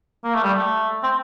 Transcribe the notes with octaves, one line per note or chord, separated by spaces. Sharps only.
A#3
A3
G3
A3
C4